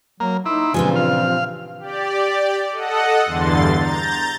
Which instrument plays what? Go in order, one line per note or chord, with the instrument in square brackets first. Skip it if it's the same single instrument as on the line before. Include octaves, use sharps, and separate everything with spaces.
[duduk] F#3 [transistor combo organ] A#3
[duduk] D#4 [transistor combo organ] E4 [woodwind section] C6 D6 E6
[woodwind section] G2 A#2 E3 [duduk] C#3 [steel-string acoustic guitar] F3 G3 C4 [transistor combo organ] G#3
[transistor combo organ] F5
[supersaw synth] G4 D5
A4 D#5 F#5
E2 G2 D3 C6 A6
A#5 G6 A6